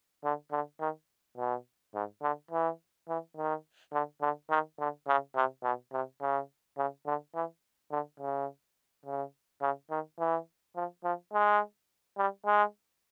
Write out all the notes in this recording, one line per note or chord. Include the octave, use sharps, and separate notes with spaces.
D3
D3
D#3
B2
G#2
D3
E3
E3
D#3
D3
D3
D#3
D3
C#3
C3
B2
C3
C#3
C#3
D3
E3
D3
C#3
C#3
C#3
D#3
E3
F3
F3
G#3
G3
G#3